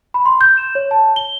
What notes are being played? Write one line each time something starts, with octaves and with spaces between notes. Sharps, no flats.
B5
C6
G6
E7
C#5
A5
G7